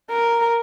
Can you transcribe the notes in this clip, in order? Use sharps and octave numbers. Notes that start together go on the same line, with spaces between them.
A#4